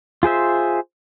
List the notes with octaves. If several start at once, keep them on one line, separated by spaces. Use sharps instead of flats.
F4 G#4 C5 E5